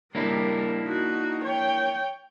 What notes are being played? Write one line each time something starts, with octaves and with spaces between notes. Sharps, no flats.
G3 A#3 D4 E4 A#4
D#4 F#4
C#5 G5